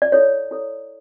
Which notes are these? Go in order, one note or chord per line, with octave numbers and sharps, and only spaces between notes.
D5
E4 A4 C#5
E4 A4 C#5